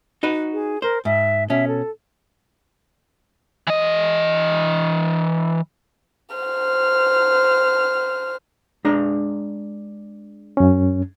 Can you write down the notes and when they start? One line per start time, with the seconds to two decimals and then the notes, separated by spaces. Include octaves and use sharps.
0.23 D#4 F#4 B4
0.53 G#4
0.82 A#4 C5
1.05 G#2 E5
1.50 B2 C#4 E5
1.68 A4
3.67 E3 D#5
6.35 C5 F6
8.85 G#3 D4 A#5
10.57 F#2 C#4